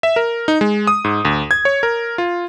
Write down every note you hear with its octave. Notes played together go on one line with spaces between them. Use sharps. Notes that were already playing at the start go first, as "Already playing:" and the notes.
E5
A#4
D#4
G#3
D#6
G#2
D2
G#6
C#5
A#4
F4